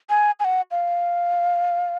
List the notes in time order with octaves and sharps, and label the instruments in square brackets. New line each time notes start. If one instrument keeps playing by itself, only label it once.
[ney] G#5
G#5
F#5
F5